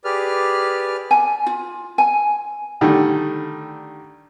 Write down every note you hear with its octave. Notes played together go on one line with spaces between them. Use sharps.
G4 G#4 B4 D5 F6
G#5
F4
G#5
D3 D#3 G3 A3